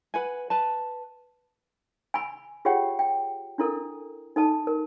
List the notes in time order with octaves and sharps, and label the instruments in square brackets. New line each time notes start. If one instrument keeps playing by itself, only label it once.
[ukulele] B4 F#5 G#5
B4 A5
[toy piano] G#5 B5
F4 G4 G#4 C#5 F#5 G5
G5
D4 E4 A4 A#4
D#4 A4 A5
A#4